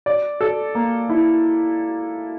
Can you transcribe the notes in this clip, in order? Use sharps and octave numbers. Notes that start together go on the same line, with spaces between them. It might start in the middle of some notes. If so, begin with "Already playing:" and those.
D5
A4
A#3
E4